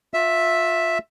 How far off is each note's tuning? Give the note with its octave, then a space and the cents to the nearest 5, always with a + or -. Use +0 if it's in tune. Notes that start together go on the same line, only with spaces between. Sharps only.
F4 +30 E5 +0 E6 +0